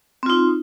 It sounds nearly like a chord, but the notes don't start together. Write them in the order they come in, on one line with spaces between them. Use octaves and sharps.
C4 F4 D#4